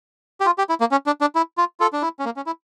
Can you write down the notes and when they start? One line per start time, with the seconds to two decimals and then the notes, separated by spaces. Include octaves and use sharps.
0.41 G4
0.46 F4
0.58 G4
0.69 E4
0.80 A#3
0.91 C#4
1.06 D4
1.21 D4
1.35 E4
1.58 F4
1.80 F4 A4
1.93 D4
2.02 E4
2.19 C#4
2.25 A#3
2.36 C#4
2.46 E4